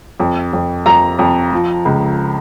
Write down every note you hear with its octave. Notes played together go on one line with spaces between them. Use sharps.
F2
F2
F2 A#5
F2
F3
C#2